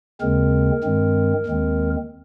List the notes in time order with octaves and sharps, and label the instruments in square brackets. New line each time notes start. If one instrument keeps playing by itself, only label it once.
[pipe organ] D#2 C#3 G#3 C4 A#4
G2 D#3 G#3 C4
D#2 D#3 G#3 C4